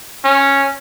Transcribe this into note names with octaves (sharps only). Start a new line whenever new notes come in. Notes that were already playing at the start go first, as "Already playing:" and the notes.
C#4